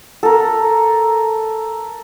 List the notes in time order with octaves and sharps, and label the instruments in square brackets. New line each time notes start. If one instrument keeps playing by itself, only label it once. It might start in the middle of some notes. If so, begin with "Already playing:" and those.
[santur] A4 A#4